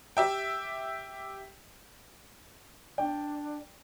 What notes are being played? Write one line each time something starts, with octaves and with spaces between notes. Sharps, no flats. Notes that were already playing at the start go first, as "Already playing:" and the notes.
G4 E5 G5
D4 D5 G5